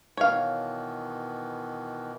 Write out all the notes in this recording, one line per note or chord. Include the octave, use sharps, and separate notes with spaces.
B2 D#3 E3 C#5 F5